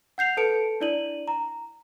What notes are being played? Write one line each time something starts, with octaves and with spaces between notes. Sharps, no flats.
F#5 G6 C7 F7
A4 B4 A5 C#7 D7
D4 E4 D5 D#7 F#7
A#5